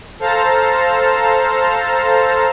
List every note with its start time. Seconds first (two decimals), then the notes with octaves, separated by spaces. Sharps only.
0.19 A4 C5 F5 A5 A#5